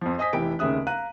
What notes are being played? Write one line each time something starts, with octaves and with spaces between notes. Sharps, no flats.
F2 F3
C5 D#5 G#5 D#6 B6
F1 E3 G4 G5 D7
F1 D#2 C#3 E5 D#6 F#6
F5 A#5 F#6 D#7